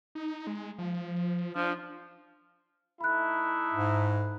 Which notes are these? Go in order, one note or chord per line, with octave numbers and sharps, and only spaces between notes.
D#4
G#3
F3
F3 D4
A3 D#4 E4 B5 F#6
G#2